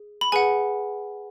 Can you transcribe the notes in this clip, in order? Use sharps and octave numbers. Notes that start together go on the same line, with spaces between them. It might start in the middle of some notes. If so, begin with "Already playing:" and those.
Already playing: G#4
B5
G#4 B4 F#5 G#5